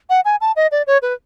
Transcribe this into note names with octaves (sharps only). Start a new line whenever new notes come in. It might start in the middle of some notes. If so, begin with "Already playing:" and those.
F#5
G#5
A5
D#5
D5
C#5
B4